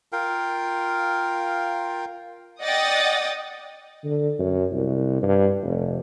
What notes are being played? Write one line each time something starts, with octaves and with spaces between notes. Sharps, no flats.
F4 A#4 F5 G5
D5 D#5 F#5 G5 D#6 A6
D3
F#2
C2
G2
F1